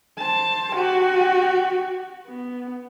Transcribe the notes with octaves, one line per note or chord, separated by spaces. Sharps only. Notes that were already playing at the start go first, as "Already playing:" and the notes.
C5 A5
F#4 G4
B3